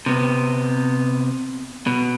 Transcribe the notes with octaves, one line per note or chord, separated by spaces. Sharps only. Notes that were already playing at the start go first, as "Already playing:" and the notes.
C3 B3
B2